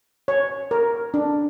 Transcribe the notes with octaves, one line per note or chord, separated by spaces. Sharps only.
C#5
A#4
D4